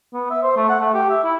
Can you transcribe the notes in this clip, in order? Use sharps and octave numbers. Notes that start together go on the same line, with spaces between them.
B3
E5
C5
A3
F#5
A3
G4
E5
E4